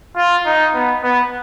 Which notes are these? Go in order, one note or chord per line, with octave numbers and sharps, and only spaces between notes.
F4
D#4
B3
B3